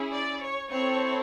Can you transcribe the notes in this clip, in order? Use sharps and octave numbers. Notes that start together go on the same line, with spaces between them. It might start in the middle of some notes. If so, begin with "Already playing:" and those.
Already playing: C#4 E4 G#4
D5
C#5
C4 E4 A4 C#5